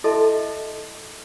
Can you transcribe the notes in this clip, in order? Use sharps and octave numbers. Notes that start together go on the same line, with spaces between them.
E4 A4 D#5 E5 A5 C6